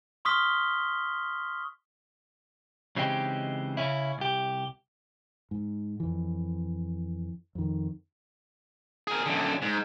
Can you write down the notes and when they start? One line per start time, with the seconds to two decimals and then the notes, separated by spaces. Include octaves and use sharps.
0.25 C6 C#6 D#6 F6 B6 G7
2.96 C#3 E3 G#3 C4 D#4 G4
3.77 C#3 C#4 E4
4.18 C2 G4
5.51 G#2
6.00 F2 E3
7.55 F2 D#3
9.07 G#4 A#4
9.26 F#2 D3
9.62 G#2